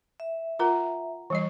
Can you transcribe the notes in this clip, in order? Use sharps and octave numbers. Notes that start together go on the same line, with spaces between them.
E5
F4 A#4 F#5 A#5
E3 G3 D#5